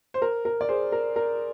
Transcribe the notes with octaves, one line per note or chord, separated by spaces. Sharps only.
C5
A#4
A#4
D5
G#4 C5
A#4
A#4